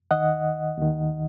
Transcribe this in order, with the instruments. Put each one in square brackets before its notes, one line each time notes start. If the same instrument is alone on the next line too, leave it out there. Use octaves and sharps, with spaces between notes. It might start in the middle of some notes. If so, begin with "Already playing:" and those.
[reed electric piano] D#2 D#3 D#5 F#5
D#2 D#3